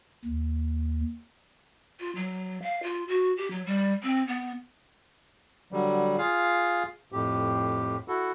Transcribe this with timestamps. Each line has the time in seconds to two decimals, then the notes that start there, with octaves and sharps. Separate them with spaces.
0.25 D#2
2.00 F4
2.16 F#3
2.62 F5
2.83 F4
3.08 F#4
3.37 G4
3.51 F#3
3.66 G3
4.03 C4
4.27 B3
5.72 D3 F#3 G3
6.18 F4 G#4 F5
7.12 F2 A2 G4
8.08 E4 F#4 A4